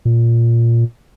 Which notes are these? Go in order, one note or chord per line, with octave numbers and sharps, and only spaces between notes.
A#2